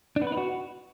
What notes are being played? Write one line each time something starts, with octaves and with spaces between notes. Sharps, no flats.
D4
B3
B4
D#4
F#4